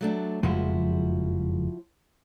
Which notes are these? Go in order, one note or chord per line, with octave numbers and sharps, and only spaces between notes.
F#3 A3 D4
F#1 F2 F3 G#3 E4 F#4